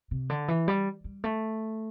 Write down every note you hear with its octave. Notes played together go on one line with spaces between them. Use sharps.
C3
D3
E3
G3
G3
A3